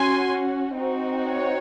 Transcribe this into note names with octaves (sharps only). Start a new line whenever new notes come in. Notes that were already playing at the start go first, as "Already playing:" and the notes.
Already playing: C#4 F#4 G#5 C6
C4 D#4 F#4
C#5